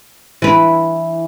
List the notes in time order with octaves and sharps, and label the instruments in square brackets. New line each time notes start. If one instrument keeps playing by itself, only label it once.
[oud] E3 B4